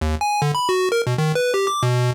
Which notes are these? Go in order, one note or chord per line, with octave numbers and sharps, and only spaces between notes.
D#2
G#5
D3
B5
F#4
A#4
B2
D#3
B4
G4
D6
B2